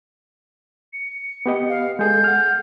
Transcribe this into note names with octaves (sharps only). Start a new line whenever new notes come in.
C#7
B3 G4 D#5
F5
G#3 G#4 A4 G6
F#5 F6